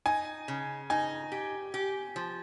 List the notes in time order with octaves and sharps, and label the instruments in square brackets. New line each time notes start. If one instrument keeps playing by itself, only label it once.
[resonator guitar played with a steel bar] D#4 [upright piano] G#5
[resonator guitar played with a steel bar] C#3
[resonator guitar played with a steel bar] D#4 [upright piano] G#5
[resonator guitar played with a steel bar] G4
G4
F3